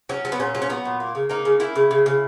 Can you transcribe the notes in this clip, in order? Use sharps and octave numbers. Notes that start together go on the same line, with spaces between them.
F#3 C#4
F#3
B3
A#2 C#4
F#3
C#4
F#3 B3
A#2
A#3
C#3
A#3 D#4
C#3
A#3 E4
C#3
C#3
C#3